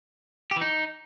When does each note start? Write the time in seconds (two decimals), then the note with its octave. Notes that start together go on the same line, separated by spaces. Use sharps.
0.51 G4
0.56 E3
0.61 D#4